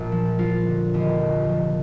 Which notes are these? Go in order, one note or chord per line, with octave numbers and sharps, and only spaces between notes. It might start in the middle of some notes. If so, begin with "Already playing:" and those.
Already playing: A#1 A#2
F3
F3 F4
D3
D#2
F1
F3